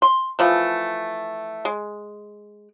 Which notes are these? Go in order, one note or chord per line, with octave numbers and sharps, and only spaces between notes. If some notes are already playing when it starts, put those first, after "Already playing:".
C6
E3 F3 A3
G#3